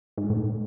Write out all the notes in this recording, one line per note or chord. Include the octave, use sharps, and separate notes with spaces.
G#2
A2